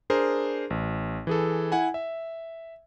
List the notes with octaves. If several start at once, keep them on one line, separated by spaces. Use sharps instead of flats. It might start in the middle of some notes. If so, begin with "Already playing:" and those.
D4 G#4 A#4 C5
A1
E3 G#4 A4
E4 F#5 G#5
E5